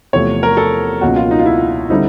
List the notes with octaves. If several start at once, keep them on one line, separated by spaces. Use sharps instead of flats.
E2 C3 F3 A3 C#5
A#4
A4
C#2 B2 F#3 A#3 C#4 F#4
F4
D#4
F4
E4
D3 G3 C4 D#4 E4